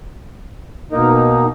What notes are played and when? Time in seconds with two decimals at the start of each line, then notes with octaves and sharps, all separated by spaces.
0.92 B2 A#3 D#4 A#4